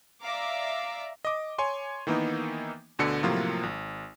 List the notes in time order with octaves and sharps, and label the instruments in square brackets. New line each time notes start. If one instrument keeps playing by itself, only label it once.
[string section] D5 E5 F5 A#5 D6
[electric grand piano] D#5 D6
C#5 G#5 C6
D#3 E3 A#3 B3 D#4
D2 B2 D3 A4 C#7
A2 C3 F3 F#3 A#3 F4
G#1